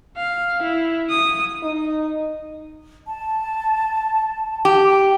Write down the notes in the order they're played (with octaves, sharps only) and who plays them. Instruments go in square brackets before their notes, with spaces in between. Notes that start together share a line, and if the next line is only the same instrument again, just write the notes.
[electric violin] F5
E4
D#6
[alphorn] D#4
[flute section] A5
[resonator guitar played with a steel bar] G4